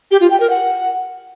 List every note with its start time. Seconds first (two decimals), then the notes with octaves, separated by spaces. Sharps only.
0.11 G4
0.21 F4
0.30 G5
0.40 A#4
0.50 F#5